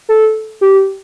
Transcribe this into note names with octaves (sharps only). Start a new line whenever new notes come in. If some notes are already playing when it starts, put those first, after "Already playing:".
A4
G4